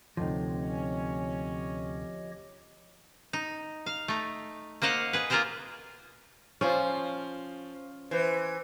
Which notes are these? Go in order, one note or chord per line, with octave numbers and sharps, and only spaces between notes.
D2 C3 F3 D#4 G4 C#5 D#5
C#4
D#4
F5
A3 D#4
A#3 C5 D#5 F5 F#5
G#4 B4
A#3 F4 G#4 A#4 C5 D#5
F3 C#4 F4 C5 D5
E3 C5